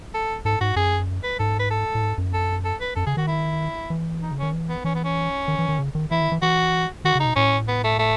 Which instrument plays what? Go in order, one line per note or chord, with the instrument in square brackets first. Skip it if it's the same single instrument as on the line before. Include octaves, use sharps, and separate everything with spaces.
[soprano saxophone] A4
[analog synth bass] G#2 [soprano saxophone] A4
[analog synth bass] G#2 [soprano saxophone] F#4
[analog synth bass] F#2 [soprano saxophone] G#4
[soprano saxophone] B4
[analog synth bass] G#2 [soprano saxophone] A4
[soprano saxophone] B4
A4
[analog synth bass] A2
G#2
F#2
[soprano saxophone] A4
A4
B4
[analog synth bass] F#2 [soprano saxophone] A4
[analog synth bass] C#3 [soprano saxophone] G#4
[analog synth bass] D#3 [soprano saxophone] F#4
[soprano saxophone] E4
[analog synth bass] E3
[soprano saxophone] D#4
[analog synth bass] C#3
[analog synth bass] D#3 [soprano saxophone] C#4
[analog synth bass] E3
[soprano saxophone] B3
[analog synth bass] E3 [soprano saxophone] C#4
[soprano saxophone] B3
C#4
[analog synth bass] D#3
E3
D#3
C#3
D#3
[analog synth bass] E3 [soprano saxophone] E4
[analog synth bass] D#3
E3
[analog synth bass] E3 [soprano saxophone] F#4
[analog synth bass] D#3 [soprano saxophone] F#4
[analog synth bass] C#3
[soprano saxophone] D#4
[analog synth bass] B2
[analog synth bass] A2 [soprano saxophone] C#4
[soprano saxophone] B3
A3
A3